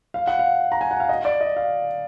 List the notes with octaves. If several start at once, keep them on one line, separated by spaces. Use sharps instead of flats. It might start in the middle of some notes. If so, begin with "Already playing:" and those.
F5
F#5
F5
A#5
G#5
F#5
F5
D#5
D5
D#5
F5